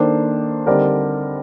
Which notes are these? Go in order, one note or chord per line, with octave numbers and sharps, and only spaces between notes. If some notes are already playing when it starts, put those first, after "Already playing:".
Already playing: D#3 A#3 D4 A4 C5
D3 G3 C4 D#4 A#4 D5